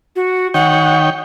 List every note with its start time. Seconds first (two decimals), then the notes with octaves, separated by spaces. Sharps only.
0.16 F#4
0.54 D#3 C#5 F#5 G5